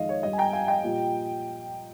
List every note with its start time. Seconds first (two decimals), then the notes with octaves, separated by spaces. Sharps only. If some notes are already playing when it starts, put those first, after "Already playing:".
Already playing: F2 D#3 G#3 D#5 F5
0.09 C#5
0.23 G2 G3 D#5
0.33 G#5
0.38 G5 A#5
0.53 F5 G#5
0.68 D#5 G5
0.84 A#2 G3